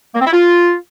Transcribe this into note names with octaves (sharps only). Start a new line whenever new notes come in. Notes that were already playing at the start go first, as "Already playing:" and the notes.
A#3
C4
E4
F4